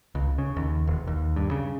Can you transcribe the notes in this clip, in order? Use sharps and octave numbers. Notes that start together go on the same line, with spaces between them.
C#2
C#3
D#2
E1
D#2
G2
C#3